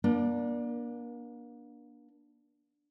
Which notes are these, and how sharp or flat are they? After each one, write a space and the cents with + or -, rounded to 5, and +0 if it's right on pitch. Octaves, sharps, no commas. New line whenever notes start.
A#3 +35 D4 +0